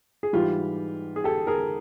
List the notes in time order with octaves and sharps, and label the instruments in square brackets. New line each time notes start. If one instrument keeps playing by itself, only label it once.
[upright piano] G#4
G#2 E3 G3 F4 G4
G#4
G4 A4
G#4 A#4